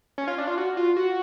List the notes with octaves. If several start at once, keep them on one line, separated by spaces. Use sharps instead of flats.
C#4
F4
D4
F4
F#4
F4
F#4